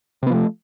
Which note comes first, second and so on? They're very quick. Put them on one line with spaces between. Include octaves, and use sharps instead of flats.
C3 B3 F3 A3